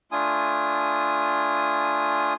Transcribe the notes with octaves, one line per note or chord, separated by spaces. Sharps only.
A3 D4 F4 G#5 D#6